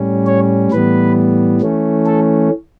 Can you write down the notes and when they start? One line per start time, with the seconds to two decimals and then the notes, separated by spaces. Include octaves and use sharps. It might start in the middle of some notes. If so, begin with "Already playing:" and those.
Already playing: A2 G3 C#4
0.26 C#5
0.71 A2 E3 G3 B3 B4
1.61 E3 A3 C#4
2.06 A4